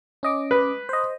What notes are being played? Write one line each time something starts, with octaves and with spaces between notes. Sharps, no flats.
C#4 D#5 D6
B4
C5 D#5